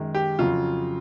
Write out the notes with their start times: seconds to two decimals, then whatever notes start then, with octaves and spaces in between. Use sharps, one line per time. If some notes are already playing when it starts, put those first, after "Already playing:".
Already playing: F#2 D#3 G#3
0.15 G4
0.39 F2 C#3 F#3 F4